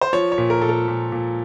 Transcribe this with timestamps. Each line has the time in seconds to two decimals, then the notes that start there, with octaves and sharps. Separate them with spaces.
0.01 C5
0.13 F3 C#5
0.32 C#5
0.38 A#2
0.50 A#4
0.61 A#2 A4
0.69 A#4
0.88 A#2
1.12 A#2